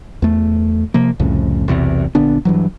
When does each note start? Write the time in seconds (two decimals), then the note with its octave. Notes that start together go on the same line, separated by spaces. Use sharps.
0.22 E2 A3
0.94 C3 F3 A#3
1.20 C2 F2 A2 C#3
1.68 B1 E2 C3
2.15 A#1 D3 B3 D4
2.45 G2 E3 F#3